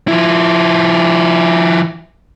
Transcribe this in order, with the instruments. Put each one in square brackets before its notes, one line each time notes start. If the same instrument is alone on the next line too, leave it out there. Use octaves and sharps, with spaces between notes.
[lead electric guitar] F3 E4